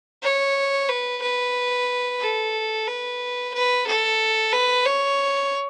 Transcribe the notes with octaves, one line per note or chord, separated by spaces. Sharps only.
C#5
B4
B4
A4
B4
B4
A4
B4
C#5